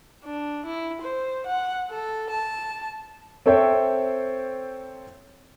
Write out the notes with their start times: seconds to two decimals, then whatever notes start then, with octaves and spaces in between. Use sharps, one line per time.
0.24 D4
0.66 E4
1.02 C5
1.46 F#5
1.90 A4
2.30 A5
3.46 C4 A4 C5 C#5 E5 G5